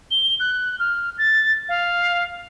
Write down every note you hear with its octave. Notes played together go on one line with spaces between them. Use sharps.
G7
F#6
F6
A6
F5